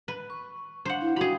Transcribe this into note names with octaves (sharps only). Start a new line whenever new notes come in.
B4
C#6
D4 C5 F5 F#5
E4
D4 F#4 G#4 F5 G5 B5